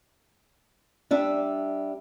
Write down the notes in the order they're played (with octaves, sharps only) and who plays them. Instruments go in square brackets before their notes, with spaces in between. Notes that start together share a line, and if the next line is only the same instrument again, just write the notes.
[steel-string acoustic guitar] G3 D4 E5